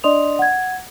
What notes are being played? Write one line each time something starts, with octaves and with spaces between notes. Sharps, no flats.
D4 D5 D#5 C6 D#6 F7
F#5 G#6